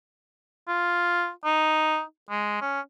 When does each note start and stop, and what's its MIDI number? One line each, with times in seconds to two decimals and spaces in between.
0.68 1.30 65
1.44 2.02 63
2.30 2.59 56
2.61 2.80 61